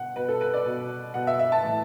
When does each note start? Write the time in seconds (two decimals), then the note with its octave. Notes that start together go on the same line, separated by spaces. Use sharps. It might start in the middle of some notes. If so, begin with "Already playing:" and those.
Already playing: B2 F#5
0.16 B2 B4
0.29 A4
0.41 B4
0.53 D5
0.65 B2
1.14 B2 F#5
1.27 E5
1.39 E5
1.52 A5
1.64 A2 E3